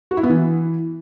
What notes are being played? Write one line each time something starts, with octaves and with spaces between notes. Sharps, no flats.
F#4
E4
B3
E3